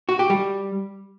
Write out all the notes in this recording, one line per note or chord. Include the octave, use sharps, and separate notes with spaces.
F#4
G4
G3